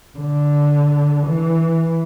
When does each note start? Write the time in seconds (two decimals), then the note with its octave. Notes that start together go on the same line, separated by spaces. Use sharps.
0.19 D3
1.27 E3